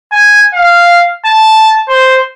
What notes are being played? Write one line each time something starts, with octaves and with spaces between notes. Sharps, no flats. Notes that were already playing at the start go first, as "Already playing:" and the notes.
G#5
F5
A5
C5